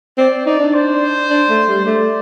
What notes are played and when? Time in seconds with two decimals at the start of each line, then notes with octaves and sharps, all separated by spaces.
0.18 C4 D5
0.46 D#4 D5
0.60 D4
0.74 C5
1.30 D4
1.49 A3
1.68 G3
1.86 A3 D5